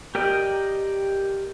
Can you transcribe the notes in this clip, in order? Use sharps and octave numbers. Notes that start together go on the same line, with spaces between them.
G4 A#4 D5 D#5 G5